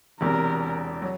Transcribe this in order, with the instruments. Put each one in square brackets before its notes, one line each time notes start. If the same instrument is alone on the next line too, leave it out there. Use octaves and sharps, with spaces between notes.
[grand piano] E1 E2 C3 [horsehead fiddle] A#4
[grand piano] F#3